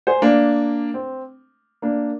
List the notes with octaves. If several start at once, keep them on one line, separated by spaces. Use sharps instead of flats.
G#4 C5
A#3 D4
C4
A#3 D4